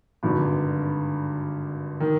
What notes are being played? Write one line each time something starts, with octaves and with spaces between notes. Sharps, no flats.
G#1 G2 D3
D#3